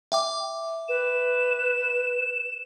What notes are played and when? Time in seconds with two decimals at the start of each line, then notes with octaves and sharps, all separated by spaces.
0.12 E5 G5 D6
0.88 B4 E7